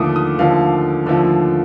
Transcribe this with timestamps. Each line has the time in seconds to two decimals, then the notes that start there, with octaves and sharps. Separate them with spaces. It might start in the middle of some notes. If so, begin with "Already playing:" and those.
Already playing: D#2 D3 F3 A3 D6 D#6
0.16 D#6
0.39 D#2 D3 F3 A3 F5
1.06 D#2 D3 F3 A3